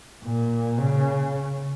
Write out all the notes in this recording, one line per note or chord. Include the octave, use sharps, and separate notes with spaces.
A#2
C#3